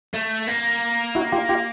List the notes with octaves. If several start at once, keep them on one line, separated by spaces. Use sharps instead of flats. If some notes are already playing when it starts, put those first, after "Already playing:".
A3
A#3
E4 F#4
F4 G4
F4 G4